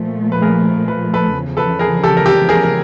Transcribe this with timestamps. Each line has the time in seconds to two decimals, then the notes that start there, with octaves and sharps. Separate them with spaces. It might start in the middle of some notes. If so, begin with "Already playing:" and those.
Already playing: A#2 F3 A3
0.32 B4
0.42 G#4 A#4
0.88 B4
1.13 A4 B4
1.34 E2 C#3 F3
1.57 A4 B4
1.79 G#4 A#4
2.03 G4 A4
2.17 A#4
2.26 G4 A4
2.49 G#4 A#4
2.63 A#4